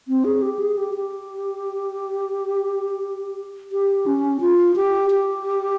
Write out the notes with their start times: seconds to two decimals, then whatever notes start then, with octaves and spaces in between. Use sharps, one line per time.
0.08 C4
0.25 G#4
0.42 G4
0.59 G#4
0.77 G4
0.94 G4
3.72 G4
4.06 C#4
4.41 F4
4.76 G4
5.10 G4